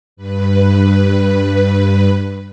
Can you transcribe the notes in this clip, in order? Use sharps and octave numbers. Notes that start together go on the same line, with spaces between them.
G2 B4